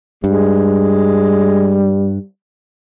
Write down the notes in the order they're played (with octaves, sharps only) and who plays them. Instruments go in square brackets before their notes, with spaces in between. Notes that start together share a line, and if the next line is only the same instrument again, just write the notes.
[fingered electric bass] G2 [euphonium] G3 [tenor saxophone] G#3